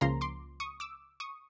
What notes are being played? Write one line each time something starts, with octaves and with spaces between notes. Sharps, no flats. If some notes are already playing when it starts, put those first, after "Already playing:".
C#2 C#3 F3 A#3 A#5 C6
C6 D6
C#6 D#6
D6 E6
C#6 D#6